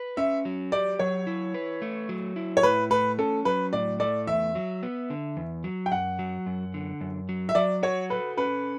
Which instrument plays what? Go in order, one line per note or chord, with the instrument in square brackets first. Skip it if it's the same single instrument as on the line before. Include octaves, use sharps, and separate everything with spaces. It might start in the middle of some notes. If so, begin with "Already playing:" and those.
Already playing: [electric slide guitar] B4
[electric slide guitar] C#4 [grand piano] E5
[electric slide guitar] F#3
[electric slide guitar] G4 [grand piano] D5
[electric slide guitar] F#3 [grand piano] C#5
[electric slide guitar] E4
B4
A3
F#3
E4
[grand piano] C#5
[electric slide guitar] A2 [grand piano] B4
[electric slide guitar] A3 [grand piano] B4
[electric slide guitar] C#4 [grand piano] A4
[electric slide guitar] F#3 [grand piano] B4
[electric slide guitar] A2 [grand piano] D5
[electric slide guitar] A3 [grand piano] D5
[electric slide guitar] E2 [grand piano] E5
[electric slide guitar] F#3
B3
D3
E2
F#3
[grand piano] G5
[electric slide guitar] F#2 [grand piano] F#5
[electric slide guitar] F#3
F#2
D3
F#2
F#3
[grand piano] E5
[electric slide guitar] F#3 [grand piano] D5
[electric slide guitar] F#4 [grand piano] C#5
[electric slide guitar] A4 [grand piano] B4
[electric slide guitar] C#4 [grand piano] B4